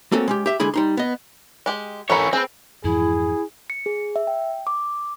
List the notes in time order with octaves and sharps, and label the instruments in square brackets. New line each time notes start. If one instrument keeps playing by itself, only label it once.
[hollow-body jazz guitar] A3 A#3 C4 C#4 F#4 A4
G#3 C#4 G4
G4 E5
D3 G#3 E4 G#4 B5
G3 D#4 C6
B3 D#5
[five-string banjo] G#3 G4
[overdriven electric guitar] E3 C#5 [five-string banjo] A4 A#4 B5
[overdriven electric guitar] C4 [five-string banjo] G#4 B4
[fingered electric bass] F2 G#2 E3 [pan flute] E4 [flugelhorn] G#4
[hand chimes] C#7
G#4
E5
G5
D6